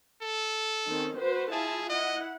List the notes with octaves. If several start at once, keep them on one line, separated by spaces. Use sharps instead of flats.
A4
D#3 C4 C#4
F#4 B4 C5
E4 F4 G#4 A5
E4 D#5 F#5